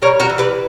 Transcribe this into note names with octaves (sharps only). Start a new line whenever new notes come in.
G3 A#4 C#5
F#4 A#4
E3
G4 B4